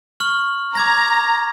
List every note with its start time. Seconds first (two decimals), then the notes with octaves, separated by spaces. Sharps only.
0.20 C#6 F6 F#7
0.75 A#5 D6 G#6 A#6